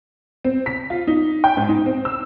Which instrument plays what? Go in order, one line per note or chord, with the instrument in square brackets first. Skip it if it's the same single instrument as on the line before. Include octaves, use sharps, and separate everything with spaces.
[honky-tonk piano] C4
B6
F4
D#4
G5
G#2
D#4
C4
E6